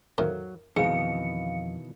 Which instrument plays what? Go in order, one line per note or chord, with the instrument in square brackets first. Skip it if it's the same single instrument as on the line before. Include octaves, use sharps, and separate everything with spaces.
[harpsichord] F2 A2 D#3 [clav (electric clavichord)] F#3
[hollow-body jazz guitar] F2 D#4 [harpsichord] G#2 [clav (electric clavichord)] B2 D#3 E3 [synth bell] F5 C#7